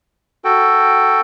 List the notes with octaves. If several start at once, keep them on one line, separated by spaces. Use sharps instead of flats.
F#4 A4 G5